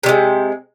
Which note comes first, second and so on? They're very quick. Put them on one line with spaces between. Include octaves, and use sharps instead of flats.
C3 G3 G#3